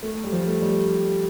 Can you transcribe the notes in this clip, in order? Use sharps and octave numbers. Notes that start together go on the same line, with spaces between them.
A3
G3
F3
A3
G3